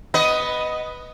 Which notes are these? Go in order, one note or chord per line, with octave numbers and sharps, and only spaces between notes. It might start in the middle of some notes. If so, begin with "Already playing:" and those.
B3 B4 D#5